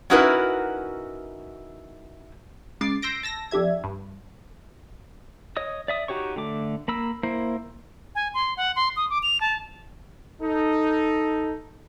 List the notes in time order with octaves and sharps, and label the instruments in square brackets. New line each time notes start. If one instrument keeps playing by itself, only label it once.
[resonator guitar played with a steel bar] C#4 D#4 E4 F#4 A#4 B4
[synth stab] C#3 G#3 D6 A6 C7
C6 E6 G6 A#6 D7
A5 E6 A#6
F2 D4 G4 E5 G#6
G2
[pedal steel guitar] C#5 D#5 D#6
D5 E5 D#6
D#4 F#4 G4 C#5 C#6
D3 A3 D6
A#3 B5 E6
A#3 E4 C5
[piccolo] G#5
C6
F#5
C6
D#6
D6
F7
A5
[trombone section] D#4 A4